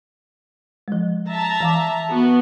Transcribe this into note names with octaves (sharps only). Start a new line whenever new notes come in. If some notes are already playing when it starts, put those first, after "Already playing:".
F3 G#3
E5 A5 A#5
E3 F5 D6
B3 F#4